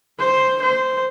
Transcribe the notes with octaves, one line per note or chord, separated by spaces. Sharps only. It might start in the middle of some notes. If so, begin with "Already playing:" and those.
C5
C5